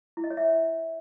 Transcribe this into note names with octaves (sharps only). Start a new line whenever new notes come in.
E4
D#5
C#5
E5